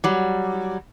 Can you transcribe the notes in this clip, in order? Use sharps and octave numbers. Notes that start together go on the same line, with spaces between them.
F#3 G3